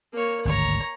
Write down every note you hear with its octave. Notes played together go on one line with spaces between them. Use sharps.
A#3 C#5
G#1 D2 G2 C#5 A#5